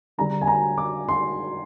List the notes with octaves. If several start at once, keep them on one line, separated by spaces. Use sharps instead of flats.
D3 G3 D4 A#5
G#5
A#5
D6
C6